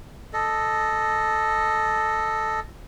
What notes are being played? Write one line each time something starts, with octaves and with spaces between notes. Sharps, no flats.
A4 D#5